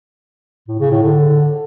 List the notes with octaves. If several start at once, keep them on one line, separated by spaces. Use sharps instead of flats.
A2
C#3
A2
D3